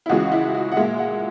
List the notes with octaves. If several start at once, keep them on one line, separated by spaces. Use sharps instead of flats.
E4
C#2 C#3 E3 G#3 F#4
E4
F#4
F#5
A#2 G#3 E5
F#5